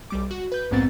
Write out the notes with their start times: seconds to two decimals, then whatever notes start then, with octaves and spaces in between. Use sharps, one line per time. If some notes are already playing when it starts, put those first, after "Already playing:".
0.10 B1 G3 D6
0.31 F#4
0.52 B4 G6
0.71 A#1 F2 G#2 B3 C4 A6